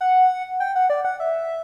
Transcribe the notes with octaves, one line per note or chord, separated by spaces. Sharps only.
F#5
G5
F#5
D5
F#5
E5